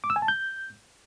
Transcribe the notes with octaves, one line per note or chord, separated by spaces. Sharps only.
D6
E6
G#5
A5
G6